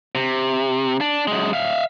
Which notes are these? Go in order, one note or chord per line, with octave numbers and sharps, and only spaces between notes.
C3
D4
F#2 G#3
E5 F5